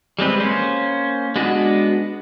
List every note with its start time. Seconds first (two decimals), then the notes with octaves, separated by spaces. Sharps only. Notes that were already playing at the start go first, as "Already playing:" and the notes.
0.19 G3 G#3 C4 B4
0.40 A#3 C#4 C5
1.36 G#3 B3 D4 F#4 D#5